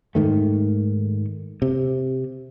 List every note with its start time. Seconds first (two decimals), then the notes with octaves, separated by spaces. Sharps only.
0.15 G#2 D#3 A3
1.62 C3